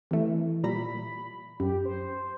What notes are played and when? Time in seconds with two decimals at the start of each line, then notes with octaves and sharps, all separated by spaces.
0.11 C3 E3 A3
0.64 A#2 G3 A#5 B5
1.60 F#2 G4
1.85 C5